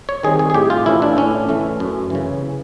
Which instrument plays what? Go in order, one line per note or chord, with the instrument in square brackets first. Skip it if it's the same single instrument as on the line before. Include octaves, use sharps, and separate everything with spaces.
[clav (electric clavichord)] C#5
D#3 G3 C4 G#4
G#4
G#4
A2 G4
F4
E3 A3 C#4 E4
D4
A2 C#4
E3 A3 C#4
F#2
C#3 E3